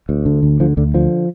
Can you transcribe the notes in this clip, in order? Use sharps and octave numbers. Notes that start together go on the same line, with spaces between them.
D2
D3
D2
D3 F3
D2 D3
D3 F3